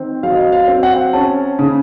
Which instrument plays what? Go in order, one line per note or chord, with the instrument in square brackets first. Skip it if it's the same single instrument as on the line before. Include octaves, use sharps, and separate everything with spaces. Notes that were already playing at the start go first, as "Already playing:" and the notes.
Already playing: [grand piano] D#3 C4
F#3 F5
D#5
F5
F5
C4
F#5
C#4 A5
C#3